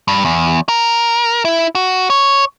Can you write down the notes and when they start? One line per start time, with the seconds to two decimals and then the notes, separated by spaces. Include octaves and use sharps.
0.08 G2
0.25 E2
0.69 A#4
1.45 E4
1.75 F#4
2.10 C#5